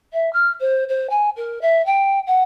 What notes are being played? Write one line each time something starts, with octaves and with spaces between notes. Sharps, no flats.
E5
F6
C5
C5
G#5
A#4
E5
G5
F#5